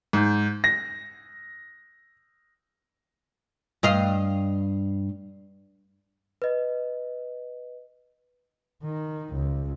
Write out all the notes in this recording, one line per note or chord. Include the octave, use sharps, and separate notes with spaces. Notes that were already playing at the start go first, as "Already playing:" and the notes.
G#2
A#6
G2 D#5 F5
B4 D#5
D#3
C#2